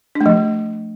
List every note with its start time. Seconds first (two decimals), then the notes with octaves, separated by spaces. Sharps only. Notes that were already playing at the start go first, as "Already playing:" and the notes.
0.15 D4
0.21 A3
0.26 F3